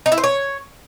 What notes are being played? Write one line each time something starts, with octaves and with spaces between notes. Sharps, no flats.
D#4
E4
C5
C#5